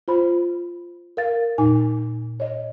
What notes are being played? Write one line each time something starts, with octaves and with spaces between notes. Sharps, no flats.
F4 C5 B5
A#4 F5 A6
E2 A#2 D#4 G#5
C#5 D#5